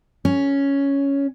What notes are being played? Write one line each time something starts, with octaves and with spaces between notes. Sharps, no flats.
C#4